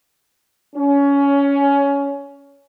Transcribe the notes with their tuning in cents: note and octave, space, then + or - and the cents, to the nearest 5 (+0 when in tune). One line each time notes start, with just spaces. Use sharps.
C#4 +20